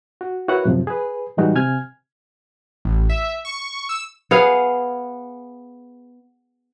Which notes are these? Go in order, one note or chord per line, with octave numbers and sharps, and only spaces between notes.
F#4
E4 F#4 A#4 B4 C#5 F#5
F#2 A2 C3 F3
G#4 B4
A2 E3 G3 G#3 D#4 F#4
C3 G#5 F6 G#6
A1
E5
C#6
E6
B3 G#4 F5